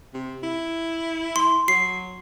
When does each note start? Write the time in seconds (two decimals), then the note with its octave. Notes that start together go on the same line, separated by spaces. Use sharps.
0.14 C3
0.43 E4
1.36 C6
1.68 F#3 C7